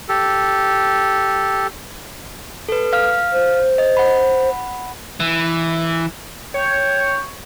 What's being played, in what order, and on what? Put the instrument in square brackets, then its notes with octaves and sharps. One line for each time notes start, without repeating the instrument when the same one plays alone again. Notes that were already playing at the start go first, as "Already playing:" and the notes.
[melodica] G4 A4
[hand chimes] A4 B4
F5 F6
[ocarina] C5
[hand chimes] D#5
F#5 B5
[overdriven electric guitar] E3
[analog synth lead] C#5 [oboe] G5